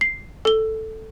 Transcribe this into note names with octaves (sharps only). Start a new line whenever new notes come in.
C7
A4 G7